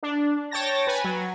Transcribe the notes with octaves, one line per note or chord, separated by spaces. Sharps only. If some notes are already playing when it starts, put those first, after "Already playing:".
D4
C#5 G5 A5 A6 A#6
B4 G#5
F#3